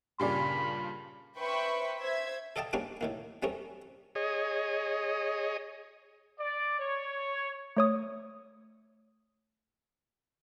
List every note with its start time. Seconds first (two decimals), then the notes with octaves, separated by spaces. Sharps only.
0.20 G2 A#2 C#3 G4 G#4 D5 B5
1.39 B4 C5 E5 G5 B5 C#6
1.99 C5 E5 G#6
2.56 A4 D5 D#5 F5 G5 A5
2.73 G#2 G3 A#3 C#4 D4 D6
3.01 A2 D#3 A#3
3.43 G3 A3 C4 C#4 A#4
4.15 G#4 C#5 D#5
6.39 D5
6.78 C#5
7.77 A3 C#5 D#6